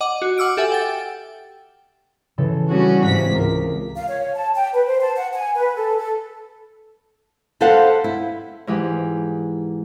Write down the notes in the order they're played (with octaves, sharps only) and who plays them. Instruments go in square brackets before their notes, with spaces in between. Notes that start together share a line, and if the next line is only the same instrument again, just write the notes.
[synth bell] D#5 F#5 D6
F#4
F#5 D6 E6 F6 D7
G4 A4 E5 F#5 G#5
G5 A6
[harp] C#3 E3 A4
[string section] G3 C#4 F#4 [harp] G#4
[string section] G#2 C3 B6 [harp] F5
[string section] C#2 [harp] A#4
[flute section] F5
C#5
A5
G5
B4
C5
A5
F#5
G#5
B4
A4
A4
[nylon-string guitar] G4 A4 B4 C5 F5 F#5
E4
[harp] G#2 E3 G4